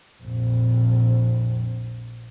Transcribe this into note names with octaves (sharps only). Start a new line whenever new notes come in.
A#1 F2